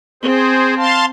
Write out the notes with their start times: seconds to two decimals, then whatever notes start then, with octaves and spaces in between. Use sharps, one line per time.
0.23 C4 G#4 C5
0.77 F5 A5 C6